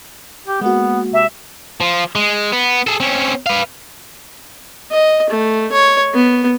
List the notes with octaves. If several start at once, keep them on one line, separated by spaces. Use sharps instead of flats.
G4
G#3 A#3 B3 F#4
C3 E5
F3
G#3
B3
G#4 A4
C4 C#4
B4 F5
D#5
A3
C#5
B3